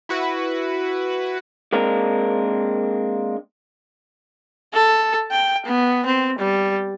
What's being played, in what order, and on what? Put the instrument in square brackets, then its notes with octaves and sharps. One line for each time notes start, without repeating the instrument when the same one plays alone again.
[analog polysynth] E4 F#4 B4
[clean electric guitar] G#3 A#3 C4 D4 A#4
[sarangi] A4
G5
B3
C4
G3